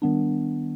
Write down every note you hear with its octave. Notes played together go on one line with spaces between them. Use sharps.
D#3 G3 B3 D4